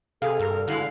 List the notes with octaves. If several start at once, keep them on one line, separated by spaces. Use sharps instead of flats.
C3 G#4 A4 F5
G2 A#4
D3 G#3 E4 F#4 F5